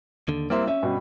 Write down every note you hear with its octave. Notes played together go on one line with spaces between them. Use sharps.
D#2 D3
G3 A#3 C4 E4 E5
C#4 E5
G2 B2